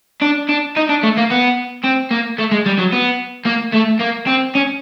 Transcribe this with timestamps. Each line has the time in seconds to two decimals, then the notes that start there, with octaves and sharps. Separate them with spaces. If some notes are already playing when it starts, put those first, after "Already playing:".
0.21 D4
0.49 D4
0.76 D#4
0.89 D4
1.03 A3
1.17 A#3
1.30 B3
1.84 C4
2.11 A#3
2.38 A3
2.51 G#3
2.66 G3
2.79 F#3
2.93 B3
3.46 A#3
3.74 A3
4.00 A#3
4.27 C4
4.55 C#4